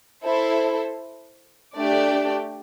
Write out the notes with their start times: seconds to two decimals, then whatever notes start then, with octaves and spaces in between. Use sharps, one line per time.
0.24 E4 A4 C5
1.76 A3 D4 G4 D5